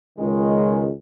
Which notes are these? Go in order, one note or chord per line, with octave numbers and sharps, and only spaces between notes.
C#2 D#3 G#3